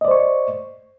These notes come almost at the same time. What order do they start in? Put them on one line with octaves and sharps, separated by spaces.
D#5 D5 C5 C#6